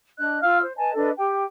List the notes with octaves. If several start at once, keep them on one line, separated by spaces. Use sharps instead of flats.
D4 D#5 F#6
F4 F5 E6 F6
C5
B4 D#5 G#5 A5
D4 A4 B4 D#5
G4 G5